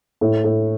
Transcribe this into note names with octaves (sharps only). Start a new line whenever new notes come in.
A2
A2